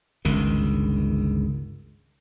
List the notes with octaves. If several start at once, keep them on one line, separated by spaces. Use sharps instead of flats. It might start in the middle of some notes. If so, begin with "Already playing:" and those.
G1 C#2 D#3